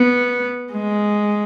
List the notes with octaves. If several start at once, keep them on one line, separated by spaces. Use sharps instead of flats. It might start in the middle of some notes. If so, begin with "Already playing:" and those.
Already playing: B3
G#3